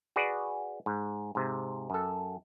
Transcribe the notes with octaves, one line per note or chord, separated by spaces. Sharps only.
F#4 G#4 B4 D5
G#2
G#2 C3
F#2 A4